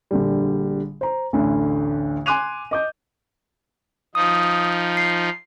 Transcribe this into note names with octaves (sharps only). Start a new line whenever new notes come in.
A#1 D3 G3
C5 A#5
A1 D2 D3
G#5 C6 D6 F#6 D#7 F7
D#5 D6 G6
F3 D#4 D#6
C7